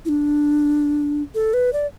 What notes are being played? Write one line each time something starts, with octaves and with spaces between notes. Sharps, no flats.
E4
D4
A4
B4
D5